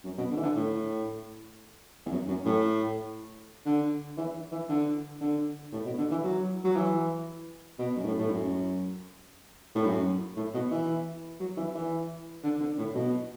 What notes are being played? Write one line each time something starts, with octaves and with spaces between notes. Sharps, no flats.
F#2
B2
D3
E3
D3
A2
E2
F#2
F#2
A2
D3
E3
E3
D3
D3
A2
B2
D3
E3
F#3
F#3
E3
B2
F#2
A2
A2
F#2
A2
F#2
A2
B2
E3
F#3
E3
E3
D3
D3
A2
B2